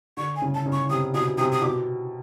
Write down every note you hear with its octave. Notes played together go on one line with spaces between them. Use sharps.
D3 C#6
G#5
C#3
A5
C#3
C#6
C3 D#6
B2 D#6
C3 D#6
D#6
B2 D6